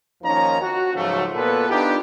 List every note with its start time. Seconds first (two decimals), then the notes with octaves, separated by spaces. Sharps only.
0.23 D#2 D#3 F3 C#4 D#4 A#5
0.62 F#4
0.94 C#2 G#2 C#3 F3 F#3 A3
1.35 A#2 B3 A4 B4
1.70 B3 D4 D#4 F4 G4